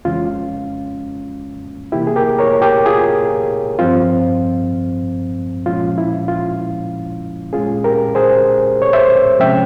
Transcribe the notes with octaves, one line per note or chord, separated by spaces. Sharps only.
F2 C#3 E3 G#3 C#4 F4
E2 C3 E3 A#3 E4 G4
G#4
G4 A#4
A#4 C#5
G4 A#4
F4 G#4
G2 F3 C4 F4
A#2 F3 G#3 C#4 F4
E4
F4
A#2 G#3 C#4 F4 G#4
G4 A#4
G#4 C5
C#5
C5 E5
C3 F3 G#3 C#4 E5 G5